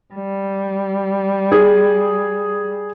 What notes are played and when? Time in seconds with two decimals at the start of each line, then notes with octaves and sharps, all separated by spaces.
0.15 G3
1.52 G#4